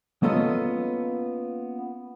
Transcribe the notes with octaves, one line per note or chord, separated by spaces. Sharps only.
A#3 B3 C#4 F4 A4 D#5